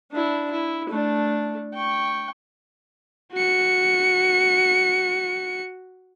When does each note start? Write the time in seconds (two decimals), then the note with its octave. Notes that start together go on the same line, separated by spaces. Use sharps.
0.11 D4 E4
0.51 E4
0.89 A3 D4
1.74 G5 C#6
3.33 F#4 C#7